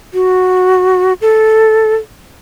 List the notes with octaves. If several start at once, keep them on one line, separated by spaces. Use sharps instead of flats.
F#4
A4